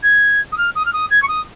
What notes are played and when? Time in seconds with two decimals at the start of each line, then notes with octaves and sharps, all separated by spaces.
0.02 G#6
0.52 D#6
0.57 F6
0.75 D#6
0.85 F6
0.93 D#6
1.10 G#6
1.22 C#6
1.28 D#6